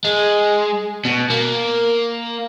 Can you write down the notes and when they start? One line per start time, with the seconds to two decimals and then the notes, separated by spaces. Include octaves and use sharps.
0.04 G#3
1.05 B2
1.30 A#3